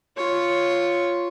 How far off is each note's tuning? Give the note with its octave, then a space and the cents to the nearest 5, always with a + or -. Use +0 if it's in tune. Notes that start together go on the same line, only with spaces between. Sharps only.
F4 +0 C#5 +0